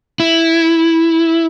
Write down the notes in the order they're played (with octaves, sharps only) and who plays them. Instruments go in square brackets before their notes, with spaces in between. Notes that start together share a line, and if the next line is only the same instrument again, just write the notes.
[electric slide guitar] E4